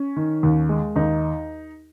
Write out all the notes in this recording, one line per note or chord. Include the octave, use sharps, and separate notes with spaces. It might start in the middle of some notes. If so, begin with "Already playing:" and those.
Already playing: C#4
D#3
D#2
G#3
D#2 D#4